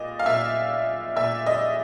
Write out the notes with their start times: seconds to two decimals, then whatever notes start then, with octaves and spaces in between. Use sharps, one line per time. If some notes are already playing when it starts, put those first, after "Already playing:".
Already playing: A#2 D#5
0.19 F5
0.26 A#2 E5
1.16 A#2 E5
1.46 D#5